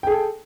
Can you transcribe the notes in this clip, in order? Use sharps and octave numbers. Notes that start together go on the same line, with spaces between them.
G#4 A4 G5